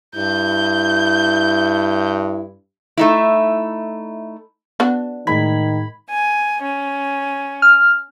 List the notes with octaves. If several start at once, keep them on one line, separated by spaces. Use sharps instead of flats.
G2 E4 G6
A3 D#4 E4
B3 D4 F#4
A2 D#3 G#3 B5 G#6
G#5
C#4
F6